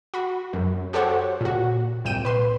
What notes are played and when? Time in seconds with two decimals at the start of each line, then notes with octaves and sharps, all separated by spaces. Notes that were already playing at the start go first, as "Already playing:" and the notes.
0.14 F#4 B5
0.53 F#2
0.93 F#4 G4 A4 C5 C#5 F#5
1.41 A#2 F#4
2.05 C2 A#2 G5 D#7 E7
2.25 B4 C6